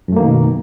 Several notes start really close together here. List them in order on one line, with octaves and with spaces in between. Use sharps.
F#2 A3 A#3 D#3 B2